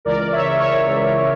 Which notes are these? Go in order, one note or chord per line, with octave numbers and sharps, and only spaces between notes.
C#2 C#3 E3 A#4 D5
D5
C#5 E5
C#5 E5
C#2 C#3 E3